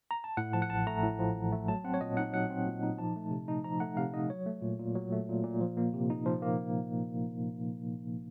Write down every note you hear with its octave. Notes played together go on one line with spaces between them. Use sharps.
A#5
A5
A2 F#5
F3 A5
F#5
A1 A5
A3 A#5
A2
F3
A1
A3
F#3 A5
C4 F#5
C#5
A#2 D#5
D#4 F#5
F#3 F#5
C4
A#2
D#4
F3 A5
A3
C3
D#4
F3 A#5
A3 F#5
C3 F5
D#4 D#5
F#3 C#5
A3
A#2
A#2
F#3
A3
A#2
A#2
F3
A#3
C3
D#4
F3
A#3